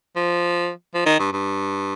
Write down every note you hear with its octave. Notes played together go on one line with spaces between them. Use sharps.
F3
F3
D#3
G2
G2